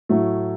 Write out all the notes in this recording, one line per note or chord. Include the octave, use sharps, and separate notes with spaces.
A2 F#3 A3